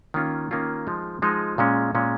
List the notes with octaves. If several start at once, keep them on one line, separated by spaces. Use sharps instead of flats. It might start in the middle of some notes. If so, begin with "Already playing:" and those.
D#3 A#3 C#4 F4
D#3 A#3 C#4 F4
F3 G#3 D#4
F3 G#3 D#4
A#2 G#3 C#4
A#2 G#3 C#4